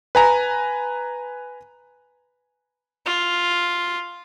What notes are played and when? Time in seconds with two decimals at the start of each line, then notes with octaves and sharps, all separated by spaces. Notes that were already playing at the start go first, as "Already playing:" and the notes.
0.15 B4 G#5 A#5
3.06 F4